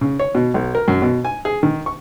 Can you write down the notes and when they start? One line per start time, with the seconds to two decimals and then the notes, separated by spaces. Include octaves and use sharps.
0.01 C#3
0.19 C#5
0.35 B2
0.54 B1
0.75 A#4
0.88 F#2
1.02 B2
1.25 G#5
1.45 G#4
1.63 D#3
1.86 C#6